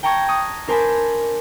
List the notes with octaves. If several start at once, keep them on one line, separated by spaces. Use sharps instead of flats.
G5 A5 A#5 C#6 G#6
C#6 D#6 F#6
D4 A#4 C5 G#5 A5 B5